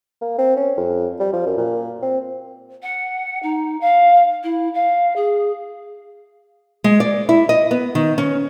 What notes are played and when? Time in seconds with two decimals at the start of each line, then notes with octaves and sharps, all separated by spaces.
0.21 A#3
0.38 C4
0.57 C#4
0.77 F2
1.20 G3
1.33 F3
1.46 F#2
1.58 A#2
2.03 C4
2.83 F#5
3.43 D#4
3.81 F5
4.43 E4
4.74 F5
5.16 G#4
6.84 G#3
7.00 D5
7.29 E4
7.49 D#5
7.71 B3
7.95 D#3
8.18 C#4